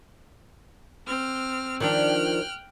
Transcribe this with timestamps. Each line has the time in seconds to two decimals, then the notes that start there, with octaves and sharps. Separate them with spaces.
1.06 C4 F6
1.80 D#3 F3 D4 G5 F6 F#6